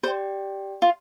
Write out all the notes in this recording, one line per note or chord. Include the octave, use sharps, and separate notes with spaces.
G4 C5 D5 G5
F4